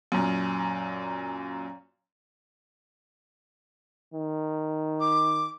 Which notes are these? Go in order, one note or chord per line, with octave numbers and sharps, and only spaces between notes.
F#2 A#2
D#3
D6